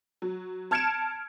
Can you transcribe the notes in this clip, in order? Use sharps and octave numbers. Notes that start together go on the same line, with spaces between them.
F#3
A5 F6 G#6 C#7 D7 E7